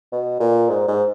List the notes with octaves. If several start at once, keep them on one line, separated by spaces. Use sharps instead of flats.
B2
A#2
G#2
G#2